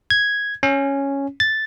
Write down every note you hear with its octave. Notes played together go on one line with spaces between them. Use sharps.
G#6
C#4
A6